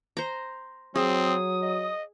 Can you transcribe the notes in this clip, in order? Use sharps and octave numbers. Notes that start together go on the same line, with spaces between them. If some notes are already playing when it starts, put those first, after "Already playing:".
C5 A#5
F#3 C4 G#4 D#6
D#5